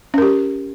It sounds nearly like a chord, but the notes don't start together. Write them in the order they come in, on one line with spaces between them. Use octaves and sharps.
C#4 A#4 G4